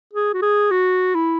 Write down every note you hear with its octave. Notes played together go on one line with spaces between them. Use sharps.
G#4
F#4
G#4
F#4
E4